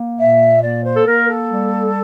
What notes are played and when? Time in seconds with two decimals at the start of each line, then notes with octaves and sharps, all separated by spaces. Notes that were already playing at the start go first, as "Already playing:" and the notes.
Already playing: A#3
0.19 A#2 E5
0.62 A#3 D5
0.84 C5
0.95 A4
1.06 A#3 A#4
1.28 A4
1.49 G3